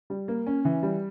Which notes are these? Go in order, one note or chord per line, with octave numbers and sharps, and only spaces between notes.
G3
A#3
C#4
E3
G3